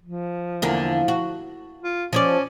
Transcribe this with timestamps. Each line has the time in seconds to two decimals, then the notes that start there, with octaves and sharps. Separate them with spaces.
0.03 F3
0.62 E2 D3 A#3
1.08 F#4
1.83 F4
2.13 F3 C#4 C#5 D5